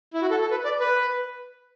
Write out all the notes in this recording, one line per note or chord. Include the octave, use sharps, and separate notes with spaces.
E4
F#4
A4
A4
B4
D5
B4